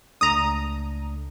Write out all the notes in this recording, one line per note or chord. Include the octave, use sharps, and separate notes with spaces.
C#2 A3 D4 A#5 D#6